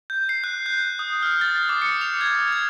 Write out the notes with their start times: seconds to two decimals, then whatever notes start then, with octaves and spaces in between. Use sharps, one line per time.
0.10 G6
0.29 C7
0.44 F#6
0.66 G6
0.99 D#6
1.23 F6
1.41 A6
1.69 D6
1.82 C#7
2.01 F7
2.21 G#6
2.53 G#6